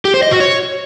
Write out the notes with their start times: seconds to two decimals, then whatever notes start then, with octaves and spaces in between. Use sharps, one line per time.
0.05 G4
0.14 C5
0.23 D#5
0.31 F#4
0.40 C#5